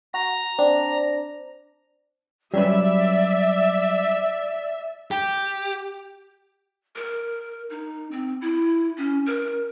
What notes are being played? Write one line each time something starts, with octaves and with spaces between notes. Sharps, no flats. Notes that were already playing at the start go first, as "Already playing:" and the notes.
F#4 A#5
C4 D4
F#3 G3 C#4 B4 D5 E5
G4
A#4
D#4
C4
E4
C#4
A#4